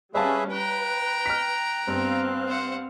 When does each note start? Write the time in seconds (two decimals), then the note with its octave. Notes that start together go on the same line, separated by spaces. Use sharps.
0.14 G3 C#4 G#4 B4 C#5 E5 F5 A5
0.52 B4 G5 A#5 F#6
1.26 F6 B6
1.88 G2 B3 C4 F5
2.48 C5 F#5